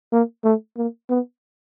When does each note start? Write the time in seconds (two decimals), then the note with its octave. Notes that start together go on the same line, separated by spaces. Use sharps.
0.12 A#3
0.44 A3
0.77 A#3
1.10 B3